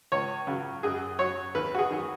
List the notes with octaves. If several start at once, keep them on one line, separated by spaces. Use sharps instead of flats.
C#2 C#5
C#3 F#3
F#2 G#4
F#3 C#5
D#2 B4
F#4
G#4
D#3 F#3